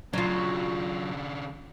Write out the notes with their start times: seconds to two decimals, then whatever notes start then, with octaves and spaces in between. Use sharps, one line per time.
0.13 C#3 F#3 D4 F4